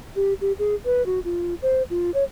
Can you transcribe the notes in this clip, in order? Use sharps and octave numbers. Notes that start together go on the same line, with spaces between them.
G4
G4
G#4
B4
F#4
F4
C5
F4
C#5